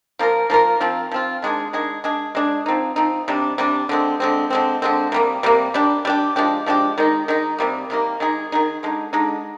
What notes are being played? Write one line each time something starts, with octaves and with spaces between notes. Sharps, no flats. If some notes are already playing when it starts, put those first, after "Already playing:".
F3 A#3 F4 A#4
F3 A#3 F4 A#4
F3 C4 F4
F3 C4 F4
D#3 G#3 D4 G#4
D#3 G#3 D4 G#4
G#3 D4 G#4
G#3 D4 G#4
F3 C4 D#4
F3 C4 D#4
C3 G3 D4
C3 G3 D4
D3 G#3 C4
D3 G#3 C4
D3 G#3 C4
D3 G#3 C4
C3 G3 A#3
C3 G3 A#3
G3 D4 G4
G3 D4 G4
F3 G#3 D4 G4
F3 G#3 D4 G4
D#3 G#3 D#4
D#3 G#3 D#4
C3 D#3 G3 A#3
C3 D#3 G3 A#3
D#3 G#3 D#4 G#4
D#3 G#3 D#4 G#4
D3 G#3 D#4
D3 G#3 D#4